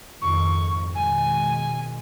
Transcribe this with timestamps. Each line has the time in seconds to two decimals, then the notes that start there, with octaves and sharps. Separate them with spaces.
0.22 F2 G#2 D#3 C#6
0.95 B2 D#3 G#3 G#5